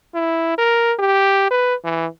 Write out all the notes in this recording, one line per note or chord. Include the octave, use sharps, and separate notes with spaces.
E4
A#4
G4
B4
E3